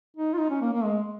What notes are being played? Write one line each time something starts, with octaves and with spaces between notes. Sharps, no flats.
D#4
F4
D#4
C#4
A#3
A#3
G#3